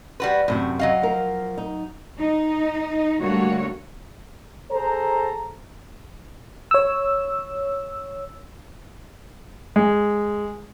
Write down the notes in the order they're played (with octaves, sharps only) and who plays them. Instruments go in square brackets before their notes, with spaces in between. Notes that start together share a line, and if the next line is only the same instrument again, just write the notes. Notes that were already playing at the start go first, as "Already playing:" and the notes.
[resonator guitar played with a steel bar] G3 F#4 B4
[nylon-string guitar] F#2 C3 F#4 [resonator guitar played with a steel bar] A2
[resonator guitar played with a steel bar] F#3 D#5 F5
[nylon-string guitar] F3 A#4
D#4
[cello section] D#4
D3 G3 A3 A#3 F#4 C#5
[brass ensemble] G#4 A4 C5 A#5
[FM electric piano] C#5 E6
[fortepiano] G#3